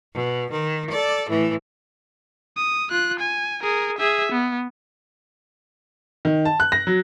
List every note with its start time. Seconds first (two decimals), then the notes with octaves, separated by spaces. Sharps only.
0.14 B2
0.51 D#3
0.90 A4 D5
1.29 A2 E3
2.57 D#6
2.91 F4 F#6
3.20 G#5
3.63 G#4 A#4
3.99 G#4 E5
4.32 B3
6.25 D#3
6.45 A5
6.60 F#6
6.72 A#6
6.87 F#3